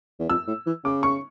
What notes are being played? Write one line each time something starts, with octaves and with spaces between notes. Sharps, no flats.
E2
F2 E6
A2
E3
C#3 D6
C#6